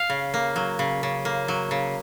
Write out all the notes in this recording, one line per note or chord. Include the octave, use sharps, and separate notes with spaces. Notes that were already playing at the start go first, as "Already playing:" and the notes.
Already playing: F5
C#3
A#3
F#3
C#3
C#3
A#3
F#3
C#3